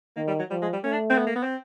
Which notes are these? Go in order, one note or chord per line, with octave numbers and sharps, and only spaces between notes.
D#3 A#3
G3
F#3
F3 G3
G#3
G3
A3 C#4
D4
C4
B3
A#3
B3
C4